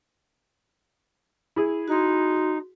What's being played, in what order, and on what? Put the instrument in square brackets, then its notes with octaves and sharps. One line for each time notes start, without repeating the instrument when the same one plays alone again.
[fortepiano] E4 G#4
[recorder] D#4 [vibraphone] F#4 C6